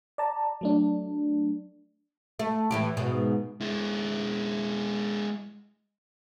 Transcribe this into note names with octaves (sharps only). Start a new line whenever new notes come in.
D5 A5 A#5
F#3 A3 D4
A3
A2 E3 G4
G#2 B2 B3
G#3 E4